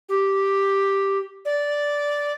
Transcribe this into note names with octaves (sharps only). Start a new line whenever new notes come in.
G4
D5